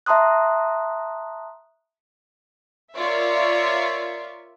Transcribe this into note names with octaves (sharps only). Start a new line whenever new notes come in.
E5 A5 A#5 C6 D#6 F#6
F4 A#4 C#5 D5 E5